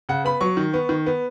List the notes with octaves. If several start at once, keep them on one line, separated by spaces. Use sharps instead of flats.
C#3 F#5
B3 B5
F#3 C#6
D#3
B3
D#3
B3